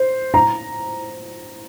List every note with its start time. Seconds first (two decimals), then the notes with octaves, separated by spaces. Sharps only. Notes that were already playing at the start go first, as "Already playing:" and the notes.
Already playing: C5
0.34 A#5